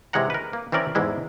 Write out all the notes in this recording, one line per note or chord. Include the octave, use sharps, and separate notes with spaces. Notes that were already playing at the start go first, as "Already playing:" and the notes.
C3 E3 G#3 C#5 F#5 A#5
A#4 B4
A#3
E3 C4 C#4 A#4 D5
E2 G#2 E3 G#3 E4